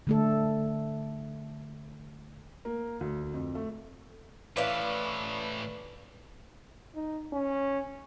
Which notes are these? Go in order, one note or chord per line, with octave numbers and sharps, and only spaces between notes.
D3 A3 A4
A#3
D2
F2
A3
A2 E3 B4 D5 F5
D#4
C#4